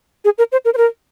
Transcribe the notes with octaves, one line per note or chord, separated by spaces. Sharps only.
G#4
A#4
C5
A#4
C5
A#4